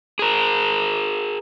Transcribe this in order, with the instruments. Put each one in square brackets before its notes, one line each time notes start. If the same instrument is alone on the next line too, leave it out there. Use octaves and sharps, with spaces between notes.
[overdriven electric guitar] G#4 A#4